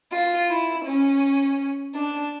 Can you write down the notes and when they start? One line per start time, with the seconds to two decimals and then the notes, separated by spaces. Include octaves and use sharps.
0.12 F4
0.50 E4
0.86 C#4
1.95 D4